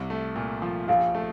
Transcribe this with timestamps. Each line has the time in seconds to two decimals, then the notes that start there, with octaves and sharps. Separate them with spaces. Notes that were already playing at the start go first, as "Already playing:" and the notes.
Already playing: C2 C3
0.10 A3
0.36 A#2
0.62 F3
0.88 A#1 F5
1.15 A3